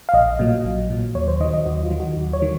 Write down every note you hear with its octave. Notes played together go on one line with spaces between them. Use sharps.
F5
A#1 D#5
A#2 F#3
A#1
A#2 F#3
D#2 C#5
C5
D#3 F#3 D#5
D#5
D#2 F#4
F4
D#3 F#3
F#4
D#2
C#5
D#3 F#3